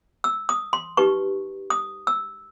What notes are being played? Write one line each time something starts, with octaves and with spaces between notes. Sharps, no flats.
E6
D#6
C6
D#4 G4 B4 C#6
D#6
E6